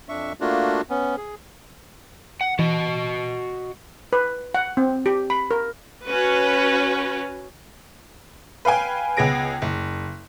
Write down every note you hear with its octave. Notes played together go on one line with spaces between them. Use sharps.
F2 D4 E5 C#6
A3 A#3 D4 F4 F#4
B3 C#4
G#4
F#5
E3 F#4 D#5
B4
F#5
C4
G4
B5
A#4
C#4 F#4 B4
B4 F5 G5 G#5
C#2 B3 G#4 A#6 D7
F#1